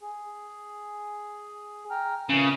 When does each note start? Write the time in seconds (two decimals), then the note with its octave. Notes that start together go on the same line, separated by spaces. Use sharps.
0.01 G#4
1.91 G5 A#5 F6
2.29 A#2 C#3 E3